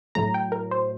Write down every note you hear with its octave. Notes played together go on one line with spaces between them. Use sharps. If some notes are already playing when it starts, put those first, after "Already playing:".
A2 F#3 A3 A#5
G5
A#4
C5